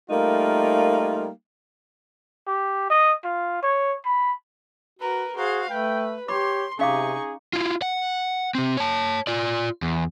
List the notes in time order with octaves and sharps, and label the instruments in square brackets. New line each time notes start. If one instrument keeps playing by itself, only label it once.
[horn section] G3 A3 A#3 D#4 F4 A#4
[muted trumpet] G4
D#5
F4
C#5
B5
[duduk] F#4 [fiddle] A#4 B4
[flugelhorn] F#4 [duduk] G#4 [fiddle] C5 F5
[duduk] A3 [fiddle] B4 [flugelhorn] G5
[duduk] G4 [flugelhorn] C#5 [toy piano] B5 D6 [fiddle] C6
[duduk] C3 [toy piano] C#4 F5 D6 [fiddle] D#4 C#6 [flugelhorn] G#4
[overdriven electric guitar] E4 F4
F#5
C3 C4
C#5 A5
F4 D5
E2